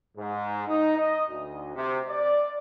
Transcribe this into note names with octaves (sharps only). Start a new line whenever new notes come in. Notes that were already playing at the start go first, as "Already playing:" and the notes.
G#2
D#4
D#5
D2
C3
D5